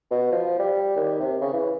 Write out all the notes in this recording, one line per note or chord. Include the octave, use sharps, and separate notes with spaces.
B2
F3
G3
D#2
C3
C#3
E3